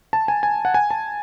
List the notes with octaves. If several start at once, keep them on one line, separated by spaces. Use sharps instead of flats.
A5
G#5
G#5
F#5
G#5
A5